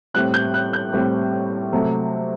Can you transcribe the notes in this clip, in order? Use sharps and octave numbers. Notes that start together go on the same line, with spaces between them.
A2 G3 C4 F#6
G6
F#6
G6
A2 G3 C4
C3 F#3 A3